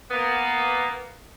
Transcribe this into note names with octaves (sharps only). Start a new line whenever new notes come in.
A#3 B3